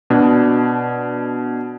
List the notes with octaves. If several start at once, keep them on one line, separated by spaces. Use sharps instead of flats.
B2 D4